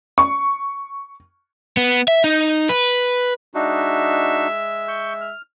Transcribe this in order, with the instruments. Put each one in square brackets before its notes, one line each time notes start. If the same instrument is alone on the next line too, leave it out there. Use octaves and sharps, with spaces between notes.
[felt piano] C#6
[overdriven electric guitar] B3
E5
D#4
B4
[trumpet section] G#3 E5 [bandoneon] D4 D#4 F#4
[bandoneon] C#6 G6
F6